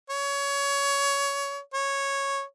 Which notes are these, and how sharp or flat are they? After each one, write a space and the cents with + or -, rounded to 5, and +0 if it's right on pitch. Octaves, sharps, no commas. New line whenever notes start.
C#5 +20
C#5 -5